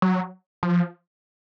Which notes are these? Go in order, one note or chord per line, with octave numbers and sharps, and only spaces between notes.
F#3
F3